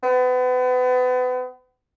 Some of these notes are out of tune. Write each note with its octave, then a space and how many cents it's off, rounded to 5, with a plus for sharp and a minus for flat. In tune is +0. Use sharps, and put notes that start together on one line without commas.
B3 +35